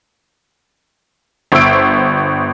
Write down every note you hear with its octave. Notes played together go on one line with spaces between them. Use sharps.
G1 C5 E5 E6 D7